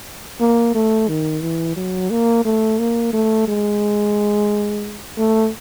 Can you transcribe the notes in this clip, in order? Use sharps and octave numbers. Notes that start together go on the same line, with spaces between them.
A#3
A3
D#3
E3
F#3
A#3
A3
A#3
A3
G#3
A3